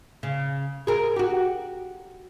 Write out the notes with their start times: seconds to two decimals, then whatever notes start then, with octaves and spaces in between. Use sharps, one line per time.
0.23 C#3
0.87 G#4 A#4
1.16 F#4 G4